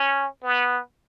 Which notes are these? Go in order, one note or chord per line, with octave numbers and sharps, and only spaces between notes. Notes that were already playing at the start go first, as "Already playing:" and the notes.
Already playing: C#4
B3